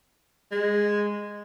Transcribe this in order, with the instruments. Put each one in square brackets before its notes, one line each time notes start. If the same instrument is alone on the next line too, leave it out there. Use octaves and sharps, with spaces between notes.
[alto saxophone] G#3